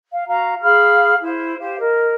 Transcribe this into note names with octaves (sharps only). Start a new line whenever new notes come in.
F5
F#4 F5 A#5
G#4 F5 B5 F6
E4 C5
G4 C5 F5
A#4 D#5